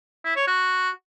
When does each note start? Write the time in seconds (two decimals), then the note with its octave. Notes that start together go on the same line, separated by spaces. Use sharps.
0.25 E4
0.36 C#5
0.47 F#4